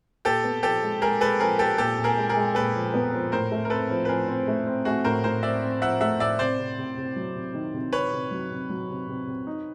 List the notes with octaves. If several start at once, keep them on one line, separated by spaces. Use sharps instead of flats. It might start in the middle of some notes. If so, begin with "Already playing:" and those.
A#2 G4 A4
B3
F3 G4 A4
G#3
G#3 G#4 A#4
G#3 A4 B4
F3 G#4 A#4
G#3 G4 A4
A#2 G4 A4
A#2
G#4 A#4
G#3
G#4 A#4
G#3
A#2 A4 B4
F3
B3
F3
A2 A#4 C5
A3
A#4
C4 A4 B4
F3
B4
F3 G#4 A#4
C4
A3
C4
A3 F#4 G#4
A2 A#4 C5
A2 A#4 C5
C4 D5 E5
C4
F3 E5 F#5
A3 E5 F#5
A2 D5 E5
C3 C5 D5
C3
C3
C3
F#3
C3
D#3
C3
C3 B4 C#5
C3
F#3
C3
F#3
C3
C3
C3
D#4